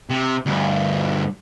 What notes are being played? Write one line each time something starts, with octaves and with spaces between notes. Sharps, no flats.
C3
D2 G2